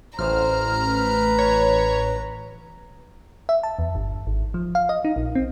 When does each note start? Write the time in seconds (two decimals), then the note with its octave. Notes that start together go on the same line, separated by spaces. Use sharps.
0.19 A1 C5 A#5 F6
0.90 B4
1.38 C#5
3.49 E5
3.63 A5
3.79 E2
3.95 G1
4.27 G#1
4.54 F3
4.75 F5
4.89 D#5
5.05 D#4
5.16 A#1
5.35 C4